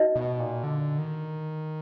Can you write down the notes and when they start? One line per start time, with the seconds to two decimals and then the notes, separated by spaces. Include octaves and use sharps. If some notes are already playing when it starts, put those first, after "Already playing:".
Already playing: D#4 F#4 B4 D#5
0.16 B2
0.39 A#2
0.63 D3
0.98 D#3